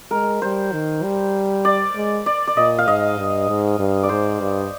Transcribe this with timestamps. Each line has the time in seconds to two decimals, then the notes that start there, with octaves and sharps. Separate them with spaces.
0.11 G#3 A#4
0.42 G3 C5
0.73 D#3
1.03 G3
1.65 D5
1.95 G#3
2.26 D5
2.47 D5
2.57 A#2 D#5
2.78 F5
2.87 G#2 D#5
3.18 G2
3.48 G#2
3.79 G2
4.03 D5
4.09 G#2 C5
4.40 G2